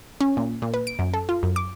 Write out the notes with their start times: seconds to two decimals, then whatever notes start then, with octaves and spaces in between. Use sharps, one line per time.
0.21 C#4
0.37 A#2
0.62 A#2
0.74 B4
0.87 D7
0.99 F#2
1.14 A4
1.29 F4
1.43 F#2
1.56 D6